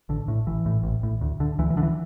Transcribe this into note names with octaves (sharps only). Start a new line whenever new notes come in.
A1 D3
A2
A1 E3
A2
A1
A2
D2
D3
D2 E3
E3
D3
E3